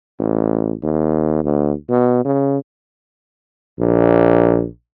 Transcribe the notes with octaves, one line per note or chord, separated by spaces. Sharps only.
A1
D#2
D2
B2
C#3
A#1